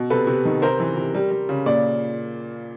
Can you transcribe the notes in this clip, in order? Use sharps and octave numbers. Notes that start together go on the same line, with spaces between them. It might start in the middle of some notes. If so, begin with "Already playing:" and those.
Already playing: B2
C3 A4 B4
C3
D#3
C3 A#4 C5
E3
C3
G3
G3
C#3
A#2 D5